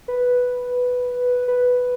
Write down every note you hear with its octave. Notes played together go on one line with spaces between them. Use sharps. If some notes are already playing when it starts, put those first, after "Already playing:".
B4
B4